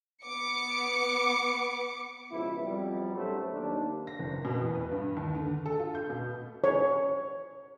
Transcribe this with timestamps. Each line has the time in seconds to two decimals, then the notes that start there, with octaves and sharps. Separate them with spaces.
0.24 B3 D6 C#7
2.32 C#2 B2 F3 E4
2.63 F2 F#3 G3
3.14 B1 F#2 F#3 A3 C5
3.52 D#2 D4
4.07 A#6
4.19 F#1
4.45 B2
4.60 E2
4.75 B4
4.91 G2
5.17 D#2
5.35 D3
5.66 A4
5.79 F4
5.95 G6
6.10 B2
6.64 C#5